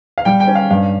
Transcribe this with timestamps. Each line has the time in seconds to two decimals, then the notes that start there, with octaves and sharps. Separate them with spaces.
0.18 F5
0.25 G3 G5
0.40 G5
0.47 C#4
0.55 F5
0.71 G2 F5